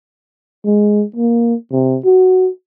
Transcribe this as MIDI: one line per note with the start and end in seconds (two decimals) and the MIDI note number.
0.65 1.04 56
1.16 1.54 58
1.72 1.98 48
2.04 2.48 66